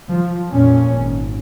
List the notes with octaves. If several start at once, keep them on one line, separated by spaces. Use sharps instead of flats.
F3
F2 A#2 C#4
G#1